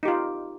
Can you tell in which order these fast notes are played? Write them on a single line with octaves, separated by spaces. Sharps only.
D#4 G4 F4